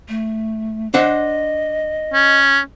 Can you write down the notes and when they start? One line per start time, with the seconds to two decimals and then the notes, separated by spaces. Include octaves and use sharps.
0.09 A3
0.94 D4 C5 D#5 F#5
2.14 C#4